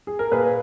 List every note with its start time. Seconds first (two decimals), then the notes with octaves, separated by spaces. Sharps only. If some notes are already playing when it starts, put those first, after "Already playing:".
0.07 G#4
0.19 A#4
0.32 A#2 G#4 B4